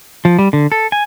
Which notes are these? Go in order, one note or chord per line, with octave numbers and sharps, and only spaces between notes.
F3
G3
D3
A4
G#5